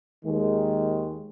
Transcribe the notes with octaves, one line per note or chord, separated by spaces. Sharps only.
D#2 D#3 G#3